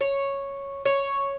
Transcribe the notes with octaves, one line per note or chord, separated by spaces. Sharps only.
C#5
C#5